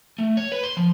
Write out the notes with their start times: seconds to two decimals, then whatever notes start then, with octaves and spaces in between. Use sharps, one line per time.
0.18 A3
0.37 C#5
0.52 B4
0.64 C6
0.77 F3